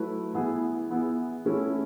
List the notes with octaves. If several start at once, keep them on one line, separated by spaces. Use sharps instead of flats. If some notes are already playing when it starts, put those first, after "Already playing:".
Already playing: F#3 A3 E4 B4
E3 B3 E4 G#4
E3 B3 E4 G#4
E3 A3 C#4 E4